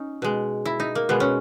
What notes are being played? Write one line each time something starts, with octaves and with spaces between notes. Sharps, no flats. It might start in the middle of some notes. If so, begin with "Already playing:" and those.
Already playing: C#4 D#4
B2 G#3
E4
D#4
A#3
B2 G#3 B3
C#4